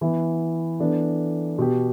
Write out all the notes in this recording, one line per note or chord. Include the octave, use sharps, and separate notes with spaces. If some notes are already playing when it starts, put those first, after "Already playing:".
E3 B3 E4
E3 B3 D4 A4
B2 B3 G4